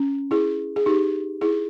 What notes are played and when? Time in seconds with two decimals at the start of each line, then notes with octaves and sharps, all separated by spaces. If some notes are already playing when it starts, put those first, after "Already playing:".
Already playing: C#4
0.31 E4 G#4
0.76 G#4
0.86 D#4 G4
1.41 E4 G#4